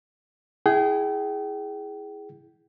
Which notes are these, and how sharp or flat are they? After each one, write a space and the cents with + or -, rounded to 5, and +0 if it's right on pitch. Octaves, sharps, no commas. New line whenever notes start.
E4 +0 G#4 +0 G5 -35